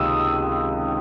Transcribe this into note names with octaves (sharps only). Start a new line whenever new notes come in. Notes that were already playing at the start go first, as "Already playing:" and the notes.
Already playing: C#2 C3 D#3 D#6 E6